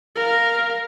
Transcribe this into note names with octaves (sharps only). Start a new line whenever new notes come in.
A#4 F5